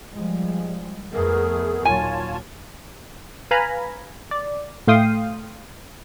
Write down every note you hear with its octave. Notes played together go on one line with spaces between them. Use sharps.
F3 G3 G#3
F2 A3 B3 G#4 A#4
D#2 A#2 F#3 F4 C#5 G#5 A5
B4 F5 G#5 A#5 B5
D5
A2 A3 F5 G5 C6 D#6